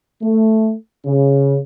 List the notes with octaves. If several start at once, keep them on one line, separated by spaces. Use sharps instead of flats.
A3
C#3